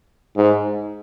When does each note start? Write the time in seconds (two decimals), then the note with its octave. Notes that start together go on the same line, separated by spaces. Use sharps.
0.37 G#2